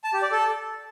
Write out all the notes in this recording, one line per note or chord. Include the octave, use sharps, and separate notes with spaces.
A5
G4
D5
A4